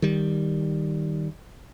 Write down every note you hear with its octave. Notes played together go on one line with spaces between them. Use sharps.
D#3 G3